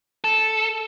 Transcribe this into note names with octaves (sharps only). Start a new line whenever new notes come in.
A4